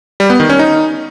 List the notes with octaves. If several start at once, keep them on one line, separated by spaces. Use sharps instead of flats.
G3
B3
D#3
C#4
D#4